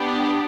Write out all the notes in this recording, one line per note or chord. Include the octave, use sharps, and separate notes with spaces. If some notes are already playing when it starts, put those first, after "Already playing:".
Already playing: B3 D4 G4